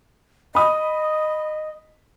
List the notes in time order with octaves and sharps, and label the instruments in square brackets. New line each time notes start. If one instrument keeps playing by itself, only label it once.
[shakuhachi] D#5 [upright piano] B5 D#6